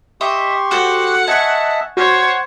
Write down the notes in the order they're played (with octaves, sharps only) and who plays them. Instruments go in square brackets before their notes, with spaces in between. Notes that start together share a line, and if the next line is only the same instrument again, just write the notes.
[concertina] G4 C6 C#6 [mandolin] D#5 E5
[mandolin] F#4 A4 C5 [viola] F#5
[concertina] D#5 E5 A5 [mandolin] G#5 C#6
[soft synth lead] F#4 [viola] C5 C#5 [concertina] F#5